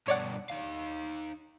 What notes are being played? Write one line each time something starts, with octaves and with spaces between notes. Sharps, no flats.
G2 B2 C#5 D5 F#5
D#4 F5